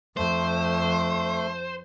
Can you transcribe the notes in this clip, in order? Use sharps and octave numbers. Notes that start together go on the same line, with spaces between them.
F2 A3 C5